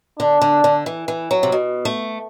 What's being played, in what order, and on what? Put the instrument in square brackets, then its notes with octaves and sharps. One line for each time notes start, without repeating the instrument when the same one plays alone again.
[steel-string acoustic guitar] D3 [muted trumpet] D4
[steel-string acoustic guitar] D3
D3
E3
E3
F#3
C3
B2
A3